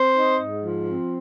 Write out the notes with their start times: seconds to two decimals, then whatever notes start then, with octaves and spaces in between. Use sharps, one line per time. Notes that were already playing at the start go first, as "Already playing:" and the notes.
Already playing: C4 C5
0.16 D#4
0.41 G#2
0.64 F3
0.89 C4